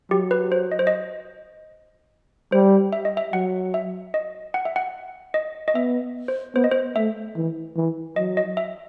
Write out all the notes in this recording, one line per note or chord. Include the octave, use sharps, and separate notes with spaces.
F#3 G4
B4
C5
D#5
C5
D#5
G3 C5
E5
D#5
E5
F#3 F#5
E5
D#5
F#5
E5
F#5
D#5
D#5
B3 E5
C5
B3 C5
D#5
C5
A3 E5
E3
E3
F#3 D#5
D#5
E5